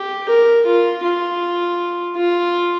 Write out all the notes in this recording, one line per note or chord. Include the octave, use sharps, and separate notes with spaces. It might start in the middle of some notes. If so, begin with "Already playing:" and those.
Already playing: G4
A#4
F4
F4
F4